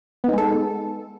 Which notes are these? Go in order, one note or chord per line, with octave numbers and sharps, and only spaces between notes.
G#3 B3 D#4 A4